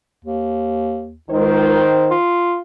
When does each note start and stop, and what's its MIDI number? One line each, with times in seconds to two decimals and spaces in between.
0.25 1.16 39
1.30 1.84 37
1.30 2.12 51
1.30 2.12 72
2.11 2.60 65